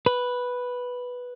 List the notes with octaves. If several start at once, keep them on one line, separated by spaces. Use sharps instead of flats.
B4